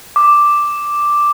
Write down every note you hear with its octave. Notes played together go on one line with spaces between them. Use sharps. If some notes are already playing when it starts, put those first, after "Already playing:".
D6